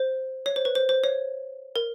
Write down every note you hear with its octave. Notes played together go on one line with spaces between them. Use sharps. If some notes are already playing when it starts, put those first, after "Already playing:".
Already playing: C5
C#5
C5
B4
C5
C5
C#5
A#4